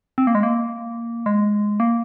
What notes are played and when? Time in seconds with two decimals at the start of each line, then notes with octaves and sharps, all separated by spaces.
0.18 C4
0.27 A#3
0.35 G#3
0.43 A#3
1.26 G#3
1.80 A#3